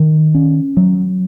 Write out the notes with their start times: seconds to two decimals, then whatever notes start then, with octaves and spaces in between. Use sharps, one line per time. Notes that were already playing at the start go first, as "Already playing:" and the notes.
Already playing: D#3
0.35 C#4
0.77 F#3